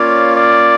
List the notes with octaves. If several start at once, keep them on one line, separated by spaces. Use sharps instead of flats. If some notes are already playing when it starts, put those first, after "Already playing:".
Already playing: A#3 C#4 F4 C#5 D5 F5
D5